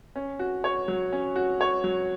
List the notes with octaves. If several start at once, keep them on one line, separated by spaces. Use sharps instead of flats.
C#4
F#4
C#5
F#3
C#4
F#4
C#5
F#3